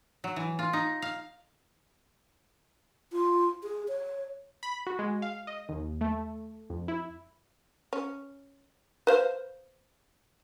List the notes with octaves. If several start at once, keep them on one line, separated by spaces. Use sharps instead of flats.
F#3
E3
F4
D#4
F5
F4
G#4
C#5
B5
F#4
G#3
F5
D#5
D#2
A3
F2
E4
C#4
B4 C5 F5